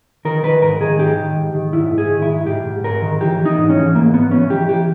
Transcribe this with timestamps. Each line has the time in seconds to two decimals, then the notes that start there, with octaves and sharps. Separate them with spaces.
0.25 D#3 A#4
0.44 D#3 B4
0.62 G#2 A#4
0.81 D#3 G#4
0.99 G#2 G4
1.18 D#3
1.36 G#2
1.54 D#3
1.73 G#2 E4
1.91 G#2
1.98 G#4
2.10 D#3
2.22 E4
2.28 G#2
2.46 G#2 G4
2.65 G#2
2.84 G#2 A#4
3.02 D#3
3.21 E3 G4
3.40 E3
3.45 D#4
3.58 G#2
3.70 C#4
3.76 E3
3.94 G#2 A#3
4.13 G#2 B3
4.31 E3 C#4
4.50 E3 G4
4.68 E3 G4